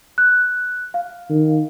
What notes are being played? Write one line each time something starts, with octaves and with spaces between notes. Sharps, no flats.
F#6
F5
D#3